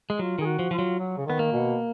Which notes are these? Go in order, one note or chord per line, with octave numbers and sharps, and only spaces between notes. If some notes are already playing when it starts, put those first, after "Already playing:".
G#3
F#3 F4
D#3 G#4
F#4
F3
F3 F4
F#3
F#3
C#3
D#3 B3
A#3
B2